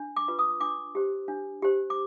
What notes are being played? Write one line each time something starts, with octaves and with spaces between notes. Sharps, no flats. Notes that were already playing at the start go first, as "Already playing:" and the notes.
Already playing: D4
D6
F4 B4
D#6
D4 D6
G4 C5
D4
G4 C5
D6